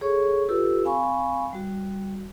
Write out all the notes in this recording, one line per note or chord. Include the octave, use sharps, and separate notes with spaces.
G#4 A4 C#5 C#6
F4 G4 A4 B4 E6
C4 F5 G#5 B5 C#6
G3 F#4